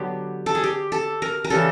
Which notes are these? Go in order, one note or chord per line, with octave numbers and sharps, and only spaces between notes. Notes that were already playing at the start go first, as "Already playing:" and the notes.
Already playing: D3 F#3 B3 G4
A4
G#4
G4
A4
A#4
A#4
C#3 E3 G3 A4